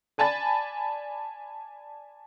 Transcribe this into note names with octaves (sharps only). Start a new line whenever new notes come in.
D5 G#5 A5 B5 A6